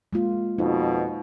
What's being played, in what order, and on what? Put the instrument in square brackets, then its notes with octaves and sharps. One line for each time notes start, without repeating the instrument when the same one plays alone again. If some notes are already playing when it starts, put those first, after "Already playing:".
[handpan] G#3 A#3 F4
[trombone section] F2 B2 [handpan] D#4